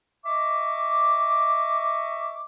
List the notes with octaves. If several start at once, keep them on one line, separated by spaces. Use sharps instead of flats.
D#5 E5 C#6 D6